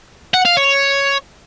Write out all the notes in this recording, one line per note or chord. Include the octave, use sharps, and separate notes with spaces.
F#5
F5
C#5